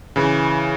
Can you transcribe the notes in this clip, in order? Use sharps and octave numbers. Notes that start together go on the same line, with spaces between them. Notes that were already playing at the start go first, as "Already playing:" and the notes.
C#3 E3